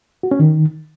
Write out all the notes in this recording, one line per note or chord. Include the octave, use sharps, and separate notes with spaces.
F#4
C#4
D#3